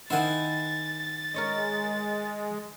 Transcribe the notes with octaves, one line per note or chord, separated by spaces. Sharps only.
D#3 E4 C5 F#5 G#5 A6
G#3 A#4 C#5 D#5